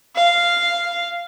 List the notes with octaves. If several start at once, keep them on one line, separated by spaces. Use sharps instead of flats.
F5